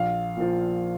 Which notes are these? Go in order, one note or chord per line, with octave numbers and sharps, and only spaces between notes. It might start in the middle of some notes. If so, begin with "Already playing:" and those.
Already playing: A#1 F5
A#2 F3